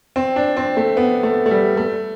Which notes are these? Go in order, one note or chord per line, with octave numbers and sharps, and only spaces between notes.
C4
D4
C4
A3
B3
A3
A3
G3
A3